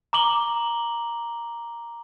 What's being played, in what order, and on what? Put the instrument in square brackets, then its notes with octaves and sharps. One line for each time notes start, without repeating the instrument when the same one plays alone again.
[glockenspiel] A#5 D6 F#7 G7